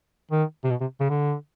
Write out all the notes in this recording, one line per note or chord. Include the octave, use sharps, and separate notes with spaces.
D#3
C3
B2
C3
C#3
D3